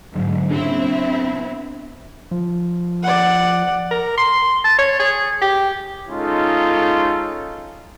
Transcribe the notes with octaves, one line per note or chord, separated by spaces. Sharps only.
G#2 D3 F#3
F#1 A#2 C#3 C4 D4 E4
B3
F3
D5 F#5
A#4
C6
A5
C#5
G#4
G4
G#3 C#4 D#4 F4 A4